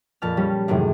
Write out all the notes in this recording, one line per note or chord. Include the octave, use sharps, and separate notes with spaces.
F2 A#2 A5 B5 F6
G3 C#4
F#2 A2 C3 D#3 E3 G#3